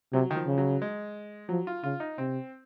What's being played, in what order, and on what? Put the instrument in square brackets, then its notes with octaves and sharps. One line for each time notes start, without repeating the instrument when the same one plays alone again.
[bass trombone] C3 [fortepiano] F#3
[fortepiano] D#3
F3
[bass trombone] C#3
[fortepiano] F#3
G#3
[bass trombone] F3 [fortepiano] F#3
[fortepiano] F4
[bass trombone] C#3 [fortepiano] F4
[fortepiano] D#4
[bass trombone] C3 [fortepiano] C4